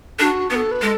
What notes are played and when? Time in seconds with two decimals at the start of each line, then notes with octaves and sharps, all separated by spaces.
0.19 D4 F#4 A4
0.50 B3 B4
0.55 A4
0.71 B4
0.82 G#3 A4